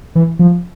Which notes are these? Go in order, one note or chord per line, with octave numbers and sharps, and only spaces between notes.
E3
F3